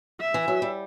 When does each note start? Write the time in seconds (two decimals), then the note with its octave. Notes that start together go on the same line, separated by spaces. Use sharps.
0.21 E5
0.34 E3
0.48 F#3
0.62 G3